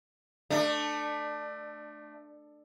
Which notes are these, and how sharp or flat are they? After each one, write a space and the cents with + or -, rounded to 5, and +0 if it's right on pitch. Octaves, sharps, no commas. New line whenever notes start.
A3 +0 D4 +20